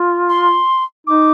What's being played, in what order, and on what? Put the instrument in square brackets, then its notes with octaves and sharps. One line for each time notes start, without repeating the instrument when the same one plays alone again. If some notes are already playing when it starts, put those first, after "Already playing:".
Already playing: [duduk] F4
[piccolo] C6
[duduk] D#4 [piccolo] D6